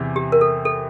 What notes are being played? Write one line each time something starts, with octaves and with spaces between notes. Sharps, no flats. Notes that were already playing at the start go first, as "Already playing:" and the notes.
Already playing: E2 C3 E3
G4
A#4
A4
A4